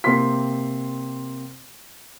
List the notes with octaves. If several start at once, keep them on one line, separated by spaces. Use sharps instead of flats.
C3 A#3 C4 C6 B6